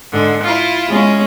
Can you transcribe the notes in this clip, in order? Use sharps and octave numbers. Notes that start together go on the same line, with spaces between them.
G#2 D3
E4 F4
G#3 C#4